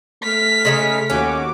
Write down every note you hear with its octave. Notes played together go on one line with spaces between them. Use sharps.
A3 F6 B6
C#3 G#3 D#4
D#2 C#4 F#4 D6